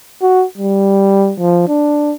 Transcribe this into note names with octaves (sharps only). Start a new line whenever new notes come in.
F#4
G3
F3
D4